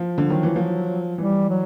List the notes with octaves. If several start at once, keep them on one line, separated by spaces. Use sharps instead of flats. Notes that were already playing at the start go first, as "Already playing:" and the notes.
Already playing: F3
D3
F#3
D#3
E3
F3
E3 G3
F#3